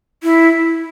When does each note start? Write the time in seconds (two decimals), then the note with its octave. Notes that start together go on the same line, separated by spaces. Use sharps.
0.23 E4